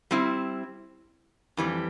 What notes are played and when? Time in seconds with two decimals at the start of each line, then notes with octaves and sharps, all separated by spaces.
0.11 G3 C4 E4
1.57 F2 E3 G3